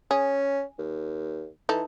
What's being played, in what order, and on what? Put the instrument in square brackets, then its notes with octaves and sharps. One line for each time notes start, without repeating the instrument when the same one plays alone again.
[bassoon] C#4 [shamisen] G#4
[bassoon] D#2
[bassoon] E3 [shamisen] D#4 A4